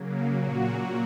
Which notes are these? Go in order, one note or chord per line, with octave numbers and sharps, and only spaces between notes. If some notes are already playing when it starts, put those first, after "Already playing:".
Already playing: C#3 F#3 A#3
A#2 F#3 A#3 F#4